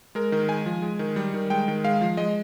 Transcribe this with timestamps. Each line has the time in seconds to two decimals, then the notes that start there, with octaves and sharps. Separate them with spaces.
0.15 G#3 A#4
0.32 D#3
0.48 G#3 G#5
0.66 F3
0.82 G#3
0.99 D#3
1.16 G3
1.34 D#3
1.50 G#3 G5
1.68 D#3
1.84 G#3 F5
2.01 F3
2.17 G#3 D#5